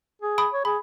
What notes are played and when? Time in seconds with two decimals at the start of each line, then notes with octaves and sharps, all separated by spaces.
0.22 G#4
0.38 B5 D#6 D7
0.53 C#5
0.65 G#4 B5